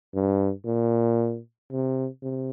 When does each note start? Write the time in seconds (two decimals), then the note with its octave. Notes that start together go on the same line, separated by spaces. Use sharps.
0.14 G2
0.66 A#2
1.71 C3
2.22 C3